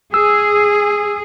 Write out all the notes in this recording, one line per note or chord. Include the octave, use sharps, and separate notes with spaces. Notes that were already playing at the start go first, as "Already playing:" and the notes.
G#4 E6